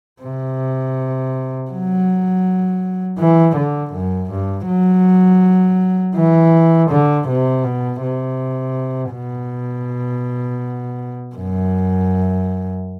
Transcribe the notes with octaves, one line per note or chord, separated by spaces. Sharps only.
C3
F#3
E3
D3
F#2
G2
F#3
E3
D3
C3
B2
C3
B2
F#2